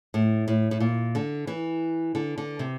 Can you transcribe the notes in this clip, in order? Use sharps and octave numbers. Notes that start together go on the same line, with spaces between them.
A2
A2
A2
A#2
D3
E3
D3
D3
C3